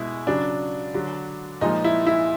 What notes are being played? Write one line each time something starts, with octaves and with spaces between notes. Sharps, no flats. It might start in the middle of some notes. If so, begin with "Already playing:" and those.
Already playing: B2 G#3 E4
C#3 F#3 D4
D3 F#3
A#2 F3 G#3 D#4
E4
E4